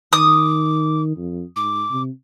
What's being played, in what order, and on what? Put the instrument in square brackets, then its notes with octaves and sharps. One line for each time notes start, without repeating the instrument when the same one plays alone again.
[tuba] D#3 [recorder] D6 [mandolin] D#6
[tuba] F2
[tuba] G#2 [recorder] D6
[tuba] C3